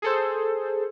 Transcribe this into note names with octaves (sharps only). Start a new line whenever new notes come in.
G#4 A4 C5